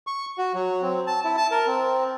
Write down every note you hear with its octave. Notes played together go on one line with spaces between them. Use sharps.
C#6
F#4
F#3
C4
A5
E4
A5
A#4
C4